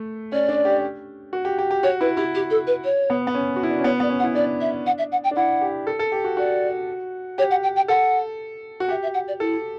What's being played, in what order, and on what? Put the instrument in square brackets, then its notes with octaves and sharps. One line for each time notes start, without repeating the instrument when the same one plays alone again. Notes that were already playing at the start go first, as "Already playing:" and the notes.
Already playing: [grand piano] A3
[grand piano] C#4 [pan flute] D5
[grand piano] D4
G4
F#4
G4
G4
G4
[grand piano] F#4 [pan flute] C#5
[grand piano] E4 [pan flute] B4
[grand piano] E4 [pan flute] G4
[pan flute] G4
A4
B4
C#5
[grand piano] B3
B3
C#4
F#4
E4
D4
C#4
[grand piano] B3 [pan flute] C#5
[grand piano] B3 [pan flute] D5
[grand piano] C#4
[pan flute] F#5
[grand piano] E4
[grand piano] D4 [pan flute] D5
[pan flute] E5
F#5
E5
F#5
G5
[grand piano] D4
[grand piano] E4 [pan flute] F#5
[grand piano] G4
A4
A4
G4
F#4
[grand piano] F#4 [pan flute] D5
[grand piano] G4 [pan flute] C#5
[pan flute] F#5
G5
G5
[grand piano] A4 [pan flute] F#5
[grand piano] F#4
[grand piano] G4 [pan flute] E5
[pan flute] E5
F#5
D5
[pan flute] E4 [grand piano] A4